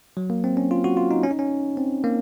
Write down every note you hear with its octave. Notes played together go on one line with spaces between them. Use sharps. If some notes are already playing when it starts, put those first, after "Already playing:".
F#3
A#3
C4
C#4
F4
F#4
F4
D#4
C#4
D#4
C#4
C4
A#3